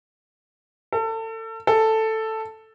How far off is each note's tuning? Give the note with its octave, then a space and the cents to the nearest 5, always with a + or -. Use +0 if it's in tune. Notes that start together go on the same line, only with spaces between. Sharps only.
A4 +30
A4 +5